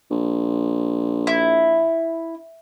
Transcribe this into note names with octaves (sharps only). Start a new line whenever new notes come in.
A#1
E4